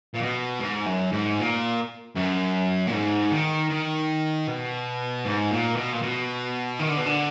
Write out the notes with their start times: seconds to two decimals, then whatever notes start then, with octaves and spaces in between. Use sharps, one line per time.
0.14 A#2
0.22 B2
0.60 G#2
0.86 F#2
1.12 G#2
1.38 A#2
2.15 F#2
2.87 A#2
2.92 G#2
3.31 D#3
3.70 D#3
4.47 B2
5.25 G#2
5.50 A#2
5.76 B2
5.92 A#2
6.02 B2
6.79 D#3
6.88 D3
6.97 B2
7.06 D3